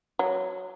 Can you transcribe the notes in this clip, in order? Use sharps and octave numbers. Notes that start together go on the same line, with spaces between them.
F#3